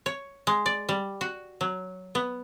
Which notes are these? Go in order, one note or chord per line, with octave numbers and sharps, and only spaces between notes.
C#5
G#3
D5
G3
F#4
F#3
B3